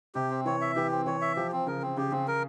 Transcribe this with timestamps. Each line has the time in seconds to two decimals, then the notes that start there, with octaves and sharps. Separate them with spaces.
0.15 C3 G4
0.30 C4
0.45 E3 C#5
0.61 E5
0.76 E3 G4
0.91 C4
1.06 E3 C#5
1.21 E5
1.36 F3 G4
1.52 C4
1.67 C#3 A#4
1.82 C4
1.97 C#3 G4
2.11 C#3 C4
2.28 A#4